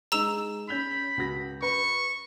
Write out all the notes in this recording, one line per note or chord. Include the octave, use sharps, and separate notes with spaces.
G#3 D#4 A#5 E6 E7
C#4 B5 G6 F7
C#2 F#4 A#6
B4 C#6